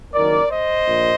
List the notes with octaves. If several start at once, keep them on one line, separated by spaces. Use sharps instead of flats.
F#1 F#2 D#3 A#4 D5
C5 D#5
A#1 A#2